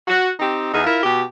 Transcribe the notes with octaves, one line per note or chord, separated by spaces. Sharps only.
F#4
C4 D#4 G4
E2 D#4 G#4
E4 F4 A#4
B2 G4